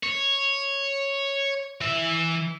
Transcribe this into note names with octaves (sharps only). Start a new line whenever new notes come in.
C#5
E3 E5